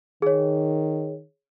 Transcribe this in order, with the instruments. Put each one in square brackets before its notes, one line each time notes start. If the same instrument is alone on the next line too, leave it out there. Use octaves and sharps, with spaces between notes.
[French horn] D#3 [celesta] G#4 C#5